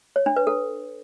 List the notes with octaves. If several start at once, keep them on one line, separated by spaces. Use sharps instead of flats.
C#5
D4
B4
A4